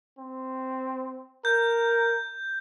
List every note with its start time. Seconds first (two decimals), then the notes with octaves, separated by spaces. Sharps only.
0.18 C4
1.45 A#4 G6